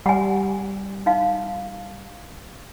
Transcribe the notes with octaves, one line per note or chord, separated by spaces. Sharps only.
G3 F#5 G#5
D#4 F5